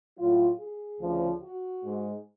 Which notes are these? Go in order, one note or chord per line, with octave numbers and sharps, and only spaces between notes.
A2 F#3 F4
G#4
D2 C#3 F3
F#4
G#2 G#3